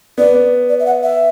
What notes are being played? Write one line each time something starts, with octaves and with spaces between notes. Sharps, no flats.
B3 D5
D5
E5
F#5
E5